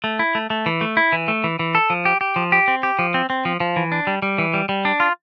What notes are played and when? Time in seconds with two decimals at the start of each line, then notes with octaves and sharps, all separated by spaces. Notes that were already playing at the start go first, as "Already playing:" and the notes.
0.04 A3
0.19 E4
0.35 A3
0.50 A3
0.66 E3
0.81 A3
0.97 E4
1.13 E3
1.28 A3
1.44 E3
1.59 E3
1.75 A4
1.90 F3
2.05 G4
2.21 G4
2.36 F3
2.52 G4
2.68 C4
2.83 G4
2.99 F3
3.14 C4
3.30 C4
3.45 F3
3.60 F3
3.76 E3
3.92 D4
4.07 G3
4.22 G3
4.38 E3
4.54 G3
4.69 G3
4.85 D4
5.00 F4